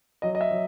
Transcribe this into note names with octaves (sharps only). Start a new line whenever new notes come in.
F#3 D#5
D#5
E5
F#3